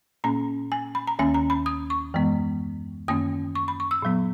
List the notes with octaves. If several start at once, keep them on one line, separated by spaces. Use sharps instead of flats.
A#2 A#3 C#4 A#5
G#5
B5
A#5
D#2 D#3 A#3 C#4 G#5
A#5
B5
D#6
C#6
F#2 E3 G#3 B3
F#2 D#3 A#3 C#4 D#6
C#6
B5
C#6
E6
A#2 F#3 B3